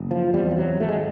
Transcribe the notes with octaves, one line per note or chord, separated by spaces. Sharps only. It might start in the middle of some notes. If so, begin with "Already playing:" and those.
Already playing: F#1
F3
E2 C3 G3
F3
F#3
G#1 A3
G#3